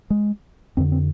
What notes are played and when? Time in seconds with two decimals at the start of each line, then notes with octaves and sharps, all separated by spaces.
0.10 G#3
0.77 F2 D3 C4
0.92 C4